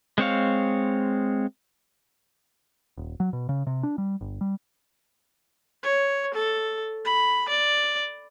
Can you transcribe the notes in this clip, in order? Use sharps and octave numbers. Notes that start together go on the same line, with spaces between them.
G#3 C4 C#5 F5
D#1
F#3
B2
C#3
C3
D4
G3
G1
G3
C#5
A4
B5
D5